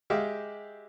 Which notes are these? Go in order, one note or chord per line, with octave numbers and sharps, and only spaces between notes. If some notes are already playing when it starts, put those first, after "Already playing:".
G#3 G4 E5 F5